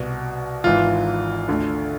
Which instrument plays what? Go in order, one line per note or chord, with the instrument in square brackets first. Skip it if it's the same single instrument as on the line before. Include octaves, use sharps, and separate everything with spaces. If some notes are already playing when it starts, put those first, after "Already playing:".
Already playing: [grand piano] C2 B2
G#1 G#2 E3 F4
D2 D3